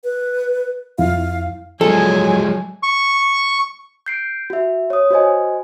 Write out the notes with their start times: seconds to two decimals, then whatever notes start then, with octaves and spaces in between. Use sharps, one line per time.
0.04 B4
0.98 F2 E4 F5
1.81 F3 F#3 G#3 A4 G#5
2.83 C#6
4.06 G6 C7 D7
4.50 F#4 E5
4.90 C#5 D#6
5.10 F#4 C5 D#5 G#5